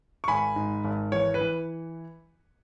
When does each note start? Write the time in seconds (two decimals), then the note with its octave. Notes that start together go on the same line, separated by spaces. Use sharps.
0.24 C#6
0.28 G#1 G#5 B5
0.56 G#2
0.84 G#1
1.12 E3 C#5
1.34 B4
1.40 E3